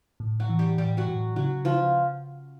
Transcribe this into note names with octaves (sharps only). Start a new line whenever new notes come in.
A2
F#3 F#4
E3
G3 G4
A2 G3 G4
F#3 F#4
A2
C#3 F#3 F#4
C#3 F3 F4